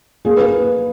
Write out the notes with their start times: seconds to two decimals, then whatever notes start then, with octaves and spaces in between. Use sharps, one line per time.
0.25 A#3 G#4
0.36 B4
0.40 A#3